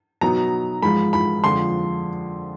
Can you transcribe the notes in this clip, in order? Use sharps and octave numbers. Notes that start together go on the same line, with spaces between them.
B2 F#3 B3 D#4 A#5
G#2 F3 G#3 B5
B5
F2 D3 F3 G#3 C6